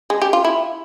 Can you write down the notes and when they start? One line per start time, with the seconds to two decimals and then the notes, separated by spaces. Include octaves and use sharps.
0.10 G#3
0.22 G4
0.33 F4
0.45 E4